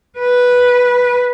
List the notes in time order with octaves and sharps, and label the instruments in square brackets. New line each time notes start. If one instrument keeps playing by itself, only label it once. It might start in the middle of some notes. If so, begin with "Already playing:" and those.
[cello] B4